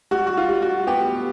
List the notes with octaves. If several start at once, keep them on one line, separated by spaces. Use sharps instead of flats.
G3 F#4
F#4
F4
G3
F#4
B3 G4